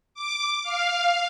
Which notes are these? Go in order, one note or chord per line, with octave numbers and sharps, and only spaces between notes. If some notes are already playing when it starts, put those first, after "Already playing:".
D6
F5